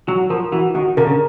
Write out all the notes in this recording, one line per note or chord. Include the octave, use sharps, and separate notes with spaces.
F#3 F#4
F3 A#4
E3 F#4
D#3 F#4
D3 A#4
C#3